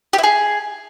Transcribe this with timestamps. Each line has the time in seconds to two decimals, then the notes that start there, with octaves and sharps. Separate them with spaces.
0.13 G4
0.18 E4
0.23 G#4